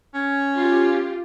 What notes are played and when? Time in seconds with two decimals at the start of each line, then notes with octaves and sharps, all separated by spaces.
0.14 C#4
0.55 F4 G4